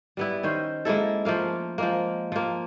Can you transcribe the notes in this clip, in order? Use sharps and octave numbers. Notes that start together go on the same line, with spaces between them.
G3 B3 E4
D#3 C#4 C5
G#3 A#3 E4 A4
F3 A3 A#3 F5
F3 G#3 A#3
F3 A#3